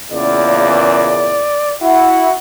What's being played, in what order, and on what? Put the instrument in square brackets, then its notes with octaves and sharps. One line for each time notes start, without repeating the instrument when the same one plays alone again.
[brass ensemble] E2 A#2 C#3 [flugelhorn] D5
[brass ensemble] E4 F#5 [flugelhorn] F#4